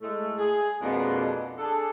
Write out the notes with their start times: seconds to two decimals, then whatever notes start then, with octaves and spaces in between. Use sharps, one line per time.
0.01 A2 G#3 A3
0.37 G#4
0.81 F2 B2 G#3 A#3 D4
1.58 D4 G#4 A4